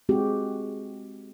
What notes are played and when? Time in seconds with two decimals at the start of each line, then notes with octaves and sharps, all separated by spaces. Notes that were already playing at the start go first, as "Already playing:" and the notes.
0.09 G#3 C4 F#4 G4